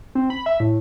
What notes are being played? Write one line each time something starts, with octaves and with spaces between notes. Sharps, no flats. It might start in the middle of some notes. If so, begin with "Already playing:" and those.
C4
B5
E5
A2